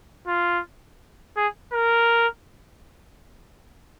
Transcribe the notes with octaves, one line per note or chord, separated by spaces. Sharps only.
F4
G#4
A#4